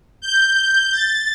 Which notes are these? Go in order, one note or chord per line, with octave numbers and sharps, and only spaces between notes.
G6
A6